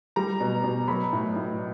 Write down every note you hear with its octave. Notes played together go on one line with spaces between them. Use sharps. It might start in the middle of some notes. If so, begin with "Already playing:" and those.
G3 A#5
B2
B2
F#3 B5
A2
A2